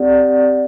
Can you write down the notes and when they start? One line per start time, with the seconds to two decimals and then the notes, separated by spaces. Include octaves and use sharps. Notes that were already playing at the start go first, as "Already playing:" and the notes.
Already playing: C4 G4 D5 F#5